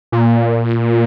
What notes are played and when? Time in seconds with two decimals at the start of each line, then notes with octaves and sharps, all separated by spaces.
0.12 A#2